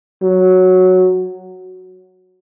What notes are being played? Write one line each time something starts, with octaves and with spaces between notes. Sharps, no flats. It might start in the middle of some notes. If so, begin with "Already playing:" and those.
F#3